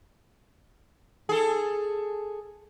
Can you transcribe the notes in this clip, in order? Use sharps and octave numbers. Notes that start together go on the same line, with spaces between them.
G#4 A4